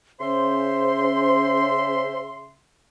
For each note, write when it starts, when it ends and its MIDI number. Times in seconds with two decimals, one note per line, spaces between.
0.21 2.55 49
0.21 2.03 61
0.21 2.18 72
0.21 2.55 76
0.21 2.55 84